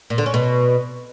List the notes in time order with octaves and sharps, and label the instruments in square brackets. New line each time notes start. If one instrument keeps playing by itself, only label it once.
[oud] A#2
D3
C#4
B2